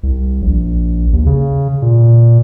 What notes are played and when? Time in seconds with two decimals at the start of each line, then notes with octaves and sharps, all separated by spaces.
0.03 C2
0.42 A#1
1.13 D#2
1.26 C#3
1.82 A#2